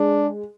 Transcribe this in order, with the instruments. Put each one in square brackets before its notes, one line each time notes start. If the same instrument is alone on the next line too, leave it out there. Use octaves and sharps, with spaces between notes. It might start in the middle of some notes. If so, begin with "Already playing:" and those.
Already playing: [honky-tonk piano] G#3 [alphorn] D4